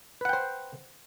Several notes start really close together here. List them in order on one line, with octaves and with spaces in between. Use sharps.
B4 F#5 G5 C5